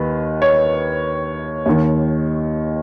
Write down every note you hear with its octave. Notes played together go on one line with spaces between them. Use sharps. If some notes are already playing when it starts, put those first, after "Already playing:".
Already playing: D#2 D#3 B4
C#5
D#2 D#3